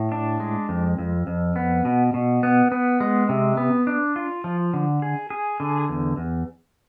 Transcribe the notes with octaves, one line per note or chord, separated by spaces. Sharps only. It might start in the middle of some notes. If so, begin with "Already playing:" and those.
Already playing: A2
D4
G#3
F2
F2
F2
B3
B2
B2
B3
B3
G#3
C3
B3
D4
F4
F3
D3
G#4
G#4
D3
E2
E2